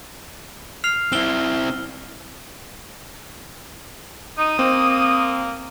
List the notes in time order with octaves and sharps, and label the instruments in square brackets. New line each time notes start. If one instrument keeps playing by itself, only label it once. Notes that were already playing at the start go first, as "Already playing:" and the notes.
[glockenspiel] F6 C7 F7
[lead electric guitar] C4 E4 [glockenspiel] E6 G7
[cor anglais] D#4 [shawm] D#6
[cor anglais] A#3 [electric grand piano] C4